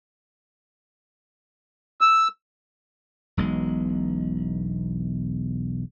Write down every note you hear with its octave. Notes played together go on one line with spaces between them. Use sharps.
E6
E1 B1 G#3